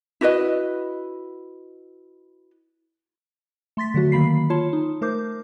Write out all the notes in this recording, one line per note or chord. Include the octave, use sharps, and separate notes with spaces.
E4 F#4 B4 D#5
A3 C6 A6 B6
D3 F#3 A3 F#4
D#3 A#3 B5 C7
F4 C#5 A5 C6
D#4
A3 A#4 C5 D6 G6